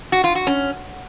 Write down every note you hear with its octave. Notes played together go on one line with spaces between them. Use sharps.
F#4
F4
F#4
C#4